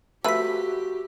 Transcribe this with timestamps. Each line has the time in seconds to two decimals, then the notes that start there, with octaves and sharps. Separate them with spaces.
0.25 F3 A3 F#4 G4 B4 E6 B6